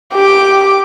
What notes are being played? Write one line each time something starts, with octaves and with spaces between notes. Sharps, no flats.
G4 D6